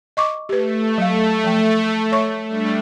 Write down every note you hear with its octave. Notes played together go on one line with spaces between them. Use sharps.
D#5 C#6 D6
A3 G4 B4
F#3 F5
F3 G5
C#5 E5 C#6
G3 A3 D4